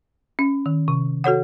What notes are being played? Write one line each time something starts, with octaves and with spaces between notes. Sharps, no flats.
C#4
D#3
C3
F#4 A4 C#5 F#5